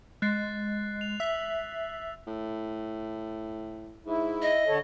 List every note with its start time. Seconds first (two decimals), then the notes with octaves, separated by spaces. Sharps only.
0.22 G#3 F#6 A6 C7
1.01 F7
1.20 E5 E6
2.27 A2
4.06 G#2 E4
4.42 D#5
4.67 D3 A4 C#5